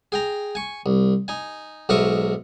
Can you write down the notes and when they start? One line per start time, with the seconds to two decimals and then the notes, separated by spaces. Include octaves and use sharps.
0.12 G#4 G5 A#5
0.55 G#5 C#6
0.86 C2
1.28 D#4 G#5
1.89 B1 G#2 A#4 E5 C#6 D#6